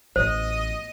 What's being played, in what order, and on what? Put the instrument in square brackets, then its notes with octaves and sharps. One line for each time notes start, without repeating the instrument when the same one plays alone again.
[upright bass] A1 [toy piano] C5 [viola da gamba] D#5